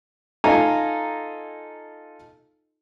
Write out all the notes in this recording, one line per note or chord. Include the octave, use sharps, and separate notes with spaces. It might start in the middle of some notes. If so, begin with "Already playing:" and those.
D#4 F4 A4 G#5 A#5